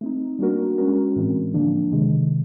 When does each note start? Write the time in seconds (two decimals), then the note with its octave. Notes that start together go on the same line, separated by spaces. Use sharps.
0.01 A3 C4 D#4
0.39 G3 A#3 D4 F#4 A#4
0.78 G#3 C#4 F#4 A#4
1.16 A2 E3 G#3 C4
1.54 D3 F3 A#3 D4
1.92 C3 D#3 G#3